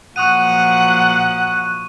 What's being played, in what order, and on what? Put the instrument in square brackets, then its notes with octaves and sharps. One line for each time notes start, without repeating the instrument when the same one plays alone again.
[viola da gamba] A#2 F3 F#3 [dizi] F#5 [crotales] C#6 D#6 D#7 [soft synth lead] F#6